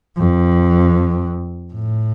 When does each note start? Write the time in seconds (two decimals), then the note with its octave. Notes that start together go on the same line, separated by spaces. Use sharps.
0.17 F2
1.74 A2